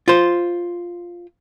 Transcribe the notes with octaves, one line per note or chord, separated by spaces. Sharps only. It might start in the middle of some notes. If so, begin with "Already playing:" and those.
F4 C5